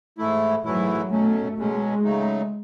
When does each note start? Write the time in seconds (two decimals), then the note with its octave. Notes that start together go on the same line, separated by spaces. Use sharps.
0.18 G#2 E3 A3 E4
0.65 G#2 E3 F#3 A3 E4
1.11 B2 F#3 A3 C#4
1.57 B2 F#3 G#3 C#4
2.04 C#3 F#3 A3 D#4